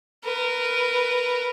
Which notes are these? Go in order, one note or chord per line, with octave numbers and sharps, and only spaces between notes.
A#4 B4